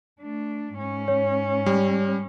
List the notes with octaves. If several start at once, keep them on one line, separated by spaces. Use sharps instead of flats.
A3 D4
G#2 C#4
C#5
G3